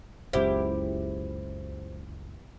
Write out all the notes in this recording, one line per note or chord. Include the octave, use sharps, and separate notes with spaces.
F#1 C#2 E4 G4 C5